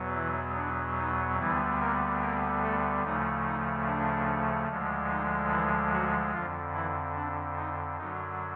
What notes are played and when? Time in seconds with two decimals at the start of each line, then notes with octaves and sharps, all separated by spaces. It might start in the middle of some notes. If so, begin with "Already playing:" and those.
Already playing: E2 B2 F#3 B3
0.15 E3 E4
0.56 D4
0.98 D#4
1.39 D2 D3 E3 G3 B3 E4
1.80 A#3 A#4
2.21 A#3 A#4
2.62 A3 A4
3.04 D2 C#3 F3 A3 D#4
3.45 D#4
3.86 D4
4.69 D2 D3 F3 G#3
5.09 D#4
5.51 E3 E4
5.92 F#3 F#4
6.33 F2 D3 F3 F4
6.74 E3 E4
7.16 D4
7.57 D#4
7.98 F#2 D3 F#3 D#4